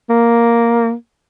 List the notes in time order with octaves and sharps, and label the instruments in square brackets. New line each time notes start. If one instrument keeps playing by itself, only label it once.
[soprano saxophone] A#3